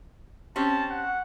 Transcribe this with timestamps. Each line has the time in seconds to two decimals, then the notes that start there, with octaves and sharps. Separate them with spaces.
0.56 C4 C#4 G4 A5
0.91 F#5